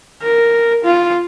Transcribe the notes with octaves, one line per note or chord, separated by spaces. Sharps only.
A#4
F4